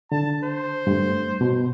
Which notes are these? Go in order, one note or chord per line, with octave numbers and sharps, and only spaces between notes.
D3 A5
C5
G2 A3
B2